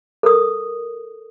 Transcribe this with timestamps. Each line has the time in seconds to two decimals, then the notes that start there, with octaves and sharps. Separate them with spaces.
0.23 A4 A#4 D#6